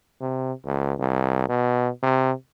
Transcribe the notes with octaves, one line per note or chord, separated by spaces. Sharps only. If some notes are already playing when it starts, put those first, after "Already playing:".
C3
C#2
C2
B2
C3